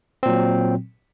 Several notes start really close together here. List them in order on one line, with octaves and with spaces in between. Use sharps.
C4 A#2 F#3